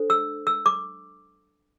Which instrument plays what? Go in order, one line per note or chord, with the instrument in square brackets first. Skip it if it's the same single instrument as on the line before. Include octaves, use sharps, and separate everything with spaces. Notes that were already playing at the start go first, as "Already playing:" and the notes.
Already playing: [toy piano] D4 A4 C5
E6
E6
D6